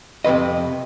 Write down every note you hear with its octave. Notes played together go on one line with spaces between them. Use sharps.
F2 C3 D#3 B4 D#5